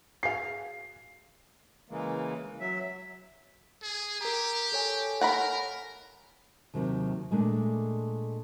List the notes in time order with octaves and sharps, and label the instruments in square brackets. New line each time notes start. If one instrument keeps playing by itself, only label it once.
[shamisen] F#4 G#4 F5 [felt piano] C7
[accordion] C#3 E3 G#3 A#3
F#3 E5
[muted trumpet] G#4
[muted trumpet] G4 [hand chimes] A#4 A#5
[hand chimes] A4 C#5 G#5
[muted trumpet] A#4 [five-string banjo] F#5 A#5 B5
[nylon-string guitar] D#2 C3 D#3 F#3
A#2 G#3 A3 D4